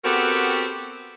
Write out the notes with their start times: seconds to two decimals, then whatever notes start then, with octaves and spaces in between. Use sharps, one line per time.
0.04 B3 C4 F#4 G4 A4 A#4